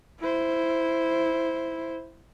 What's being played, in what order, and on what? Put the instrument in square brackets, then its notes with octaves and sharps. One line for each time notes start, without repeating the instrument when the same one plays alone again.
[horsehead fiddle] E4 C5